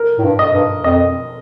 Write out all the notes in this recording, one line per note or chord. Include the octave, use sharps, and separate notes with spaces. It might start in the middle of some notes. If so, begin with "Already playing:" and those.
Already playing: A#4
A2
G2
D#5
G2
F2 D#5